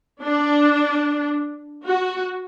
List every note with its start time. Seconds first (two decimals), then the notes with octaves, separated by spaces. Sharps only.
0.22 D4
1.86 F#4